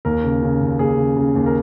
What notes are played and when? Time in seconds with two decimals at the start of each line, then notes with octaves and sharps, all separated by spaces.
0.05 D#2 A#4
0.24 C#3
0.42 C#3
0.61 D#2
0.79 D#2 G#4
0.97 C#3
1.16 C#3
1.35 D#2
1.46 A#4